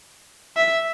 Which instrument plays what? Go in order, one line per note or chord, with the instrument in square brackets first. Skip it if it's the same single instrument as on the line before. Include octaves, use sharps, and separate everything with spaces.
[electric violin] E5